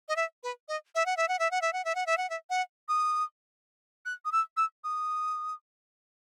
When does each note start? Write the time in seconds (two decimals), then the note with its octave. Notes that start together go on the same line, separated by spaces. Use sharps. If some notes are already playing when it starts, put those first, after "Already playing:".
0.08 D#5
0.16 E5
0.43 B4
0.68 D#5
0.95 E5
1.06 F#5
1.17 E5
1.28 F#5
1.39 E5
1.51 F#5
1.62 E5
1.73 F#5
1.85 E5
1.95 F#5
2.06 E5
2.17 F#5
2.30 E5
2.50 F#5
2.89 D#6
4.06 F#6
4.25 D#6
4.32 E6
4.57 E6
4.84 D#6